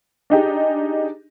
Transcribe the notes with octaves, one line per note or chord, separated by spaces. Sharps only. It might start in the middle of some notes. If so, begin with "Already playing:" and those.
D4 D#4 G4 G#4